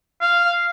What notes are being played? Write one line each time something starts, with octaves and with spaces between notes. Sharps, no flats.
F5